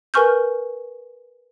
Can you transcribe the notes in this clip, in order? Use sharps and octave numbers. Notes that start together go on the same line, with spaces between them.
A#4 B4 G#5 C#6 F6 G6